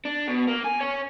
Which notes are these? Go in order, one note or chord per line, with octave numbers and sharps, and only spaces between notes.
D4
B2
A#3
G#5
C#5 G#5